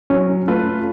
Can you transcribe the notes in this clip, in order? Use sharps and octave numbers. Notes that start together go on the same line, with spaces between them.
F#3 C#4
A3 F4 B4